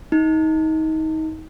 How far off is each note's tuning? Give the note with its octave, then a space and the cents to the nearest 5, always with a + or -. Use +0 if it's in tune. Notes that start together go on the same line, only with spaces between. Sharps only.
D#4 +25